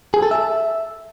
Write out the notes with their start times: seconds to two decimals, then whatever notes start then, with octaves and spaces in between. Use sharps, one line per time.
0.14 G#4
0.22 A4
0.31 E5